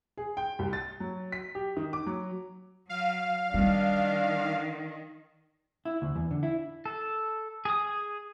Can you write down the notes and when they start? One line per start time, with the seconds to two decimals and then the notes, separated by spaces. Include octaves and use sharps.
0.17 G#4
0.37 G5
0.59 C2
0.73 A6
1.00 F#3
1.32 B6
1.55 G4
1.77 D#3
1.93 D6
2.06 F#3
2.89 F#3 F5
3.54 D#3 G3 C#4 D4
5.85 E4
6.02 D2
6.15 E2
6.31 D3
6.43 E4
6.86 A4
7.65 G#4 D#6